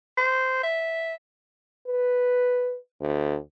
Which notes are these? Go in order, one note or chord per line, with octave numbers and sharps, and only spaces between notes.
C5
E5
B4
D2